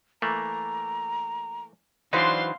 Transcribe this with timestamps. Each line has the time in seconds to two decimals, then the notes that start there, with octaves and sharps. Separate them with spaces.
0.22 E3 A3 A#3 A#5
2.13 E3 F#3 D4 D#4 C5 D5 F5 C6